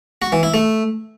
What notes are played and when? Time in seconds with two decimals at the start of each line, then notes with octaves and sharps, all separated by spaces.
0.22 F#4
0.32 E3
0.43 E4
0.54 A3